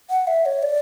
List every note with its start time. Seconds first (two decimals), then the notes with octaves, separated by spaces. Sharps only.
0.10 F#5
0.27 E5
0.46 C#5
0.63 D5